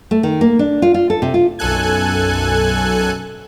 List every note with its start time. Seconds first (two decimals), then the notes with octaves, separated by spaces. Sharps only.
0.11 A3
0.23 D#3
0.41 A#3
0.59 D4
0.82 F4
0.94 F4
1.10 A4
1.22 C3
1.34 F4
1.59 B1 F#2 A4 G#5 F#6 G#6